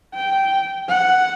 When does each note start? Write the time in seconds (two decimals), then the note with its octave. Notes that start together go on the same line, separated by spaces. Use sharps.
0.15 G5
0.88 F#5